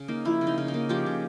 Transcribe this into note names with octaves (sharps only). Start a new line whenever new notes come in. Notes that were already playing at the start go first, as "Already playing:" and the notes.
Already playing: C#3
A#3 D#4
F3 E4
C#3
D#4
C#3
D#4
A#3
F3 G4
C#3